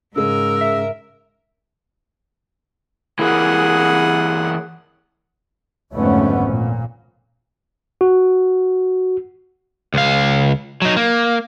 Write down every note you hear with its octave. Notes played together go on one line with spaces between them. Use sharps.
G#2 C#3 G#3 A#4 E6
E5
E3 A#3 G#4 F#5
G#1 F2 D3 A3 B3 C#4
A#2
F#4
C#2 F5
F#3 D#4
A#3